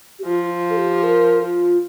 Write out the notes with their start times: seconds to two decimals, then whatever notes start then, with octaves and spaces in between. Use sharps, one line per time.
0.19 G4
0.25 F3 F4
0.70 A4
0.77 G4
1.04 A#4
1.42 F4